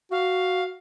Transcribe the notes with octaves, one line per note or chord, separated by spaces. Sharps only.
F#4 F5